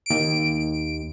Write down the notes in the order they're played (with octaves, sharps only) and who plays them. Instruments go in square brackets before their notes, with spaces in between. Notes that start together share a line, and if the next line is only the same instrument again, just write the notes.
[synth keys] D#2 D7